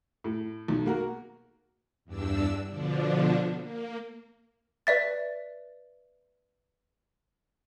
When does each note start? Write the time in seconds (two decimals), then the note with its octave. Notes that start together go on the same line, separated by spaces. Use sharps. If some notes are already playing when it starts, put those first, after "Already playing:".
0.24 A2
0.68 B1
0.86 A#3 F#4 A#4
2.05 E2 G2 D4 E6
2.70 B2 D3 F3 D4
3.60 A#3
4.87 B4 D5 E5 A6